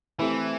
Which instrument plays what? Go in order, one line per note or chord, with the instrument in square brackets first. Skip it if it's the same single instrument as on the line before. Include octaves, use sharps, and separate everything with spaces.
[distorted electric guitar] E3 [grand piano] A3 C4 E4 G4